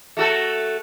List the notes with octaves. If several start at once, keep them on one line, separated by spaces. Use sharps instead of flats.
A3 F#4 A4